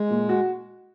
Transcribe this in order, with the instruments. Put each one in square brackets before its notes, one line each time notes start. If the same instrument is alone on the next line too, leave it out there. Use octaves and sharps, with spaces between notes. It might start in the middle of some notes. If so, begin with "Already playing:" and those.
Already playing: [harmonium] G#3
[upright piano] A#2
F#4